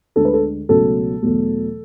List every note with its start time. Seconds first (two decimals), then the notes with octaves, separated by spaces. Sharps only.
0.16 D2 D3 G#3 A4
0.25 B4
0.33 A4
0.69 C#2 B2 F#3 A3 A4
1.23 E2 B2 F#3 A3